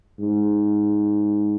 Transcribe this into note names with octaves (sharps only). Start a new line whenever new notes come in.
G#2